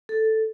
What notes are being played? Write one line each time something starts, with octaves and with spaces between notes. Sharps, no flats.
A4